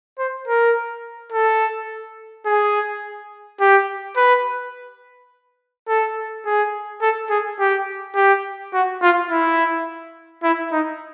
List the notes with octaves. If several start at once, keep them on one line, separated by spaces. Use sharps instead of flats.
C5
A#4
A4
G#4
G4
B4
A4
G#4
A4
G#4
G4
G4
F#4
F4
E4
E4
D#4